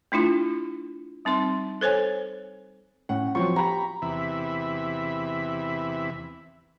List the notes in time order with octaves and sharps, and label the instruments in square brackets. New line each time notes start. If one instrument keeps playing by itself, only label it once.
[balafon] A3 D4 E4 F4
G3 C4 D#4 C6
A4 C5 C#5 G#5
[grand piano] A2 C#4 F#5
[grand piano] F3 F#3 C4 [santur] C#6
[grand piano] G4 [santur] A#5 B5
[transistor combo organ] E2 C3 E3 E5 B5